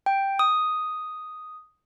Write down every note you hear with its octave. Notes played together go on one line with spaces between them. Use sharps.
G5
D#6